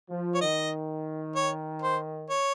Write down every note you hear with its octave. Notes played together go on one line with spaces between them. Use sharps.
F3
C#5
D#3 D#5
C#5
C5
C#5